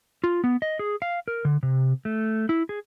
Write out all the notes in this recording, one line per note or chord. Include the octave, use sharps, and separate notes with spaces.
F4
B3
D#5
G#4
F5
A#4
D3
C3
A3
E4
G#4